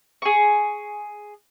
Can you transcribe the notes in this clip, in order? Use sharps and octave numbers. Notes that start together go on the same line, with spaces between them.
G#4 C#6